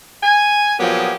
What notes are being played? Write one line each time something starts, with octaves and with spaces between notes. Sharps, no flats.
G#5
A#2 F3 F#3 B3 G4 G#4